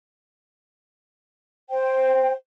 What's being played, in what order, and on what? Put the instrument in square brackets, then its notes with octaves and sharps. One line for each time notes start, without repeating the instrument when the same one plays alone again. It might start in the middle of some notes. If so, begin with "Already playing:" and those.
[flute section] C5 G5